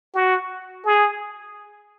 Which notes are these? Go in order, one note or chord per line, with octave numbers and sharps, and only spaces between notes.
F#4
G#4